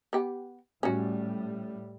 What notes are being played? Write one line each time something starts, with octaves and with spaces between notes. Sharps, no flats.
B3 G4
A2 G3 C#4 F#4